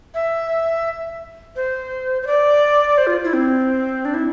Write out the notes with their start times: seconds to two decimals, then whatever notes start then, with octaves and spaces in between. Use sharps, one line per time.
0.15 E5
1.56 C5
2.22 C5
2.27 D5
2.98 C5
3.07 F4
3.24 E4
3.33 C4
4.05 D4
4.14 E4